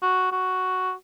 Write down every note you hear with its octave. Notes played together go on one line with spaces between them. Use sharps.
F#4
F#4